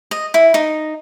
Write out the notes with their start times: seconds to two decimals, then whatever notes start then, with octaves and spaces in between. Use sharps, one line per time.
0.11 D#5
0.34 E4
0.54 D#4